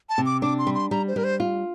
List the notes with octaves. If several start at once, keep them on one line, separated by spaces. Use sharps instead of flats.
A5
C3
D6
D4 D6
C6
G3
C6
G3 A#5
C5
G3 A#4
C5
F4